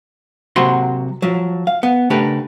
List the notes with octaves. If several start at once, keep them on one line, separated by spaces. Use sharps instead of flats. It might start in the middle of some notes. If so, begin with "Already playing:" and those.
C3 F#3 A#3 F#4 B5 C6
F3 F#3
F5
B3
C#3 A3 D4 G4 A#4 B4